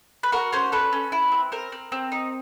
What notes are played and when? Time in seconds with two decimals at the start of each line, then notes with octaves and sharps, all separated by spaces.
0.23 B4
0.32 F#4 A#4
0.53 C#4 C5
0.72 A4 B4
0.93 C#4
1.12 E4
1.32 C4
1.52 C4 A#4
1.72 C4
1.92 C4
2.12 D#4